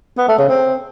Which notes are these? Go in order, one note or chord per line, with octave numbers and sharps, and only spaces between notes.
B3
A3
C#3
C4